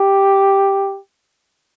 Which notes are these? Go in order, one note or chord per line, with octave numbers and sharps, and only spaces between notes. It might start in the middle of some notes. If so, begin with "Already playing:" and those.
Already playing: G4